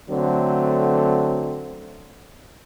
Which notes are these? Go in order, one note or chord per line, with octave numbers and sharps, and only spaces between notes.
D3 F#3 A3 C4